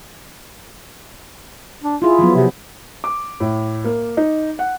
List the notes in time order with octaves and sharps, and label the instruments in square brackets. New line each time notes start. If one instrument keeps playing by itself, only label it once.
[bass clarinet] D4
[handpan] E4 G#4 [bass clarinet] F4
[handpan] F3 F#3 B3
[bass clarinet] C3
[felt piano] D6
A2
A#3
D#4
F#5